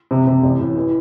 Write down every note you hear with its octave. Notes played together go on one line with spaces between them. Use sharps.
C3
C3
A1
A2
E3